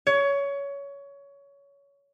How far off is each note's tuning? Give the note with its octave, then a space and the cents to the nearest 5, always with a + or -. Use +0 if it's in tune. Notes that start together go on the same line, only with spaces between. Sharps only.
C#5 +20